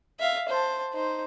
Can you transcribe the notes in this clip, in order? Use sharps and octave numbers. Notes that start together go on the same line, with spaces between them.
E5 F5
C5 A5
D#4 C5